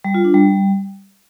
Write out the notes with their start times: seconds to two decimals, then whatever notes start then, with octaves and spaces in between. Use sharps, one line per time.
0.05 G3
0.14 F4
0.24 D4
0.34 G3